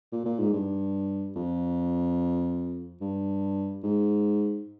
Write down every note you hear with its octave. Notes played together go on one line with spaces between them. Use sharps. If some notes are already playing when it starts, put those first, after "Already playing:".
A#2
A#2
G#2
G2
F2
G2
G#2